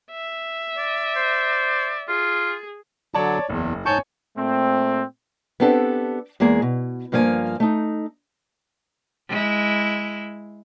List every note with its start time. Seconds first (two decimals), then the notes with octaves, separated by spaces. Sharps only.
0.12 E5
0.78 D5
1.16 C5
2.08 F4 G#4
3.14 D3 F#3 C#5 D5 A5
3.50 F#1 E2
3.86 G#2 C#5 G#5 A5 C#6 G6
4.37 A#2 A3 C4
5.60 B3 C4 D4 G4 A4
6.40 E2 G#3 A#3 G#4
6.62 B2
7.12 G2 F3 A#3 G#4 G#5
7.60 A3 D#4
9.29 G#3 E4